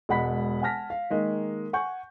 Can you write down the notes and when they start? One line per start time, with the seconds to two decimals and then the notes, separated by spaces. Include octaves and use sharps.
0.09 E1 G#3 F#5 B5 B6
0.62 F#5 G#5 A5 F6 A#6 B6
0.90 F5
1.10 D#3 G#3 A#3
1.73 F#5 G#5 C#6 G6